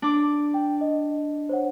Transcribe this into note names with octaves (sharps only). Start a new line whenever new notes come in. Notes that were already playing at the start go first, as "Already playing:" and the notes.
D4 D6
G5
D#5
C5 C#5 F#5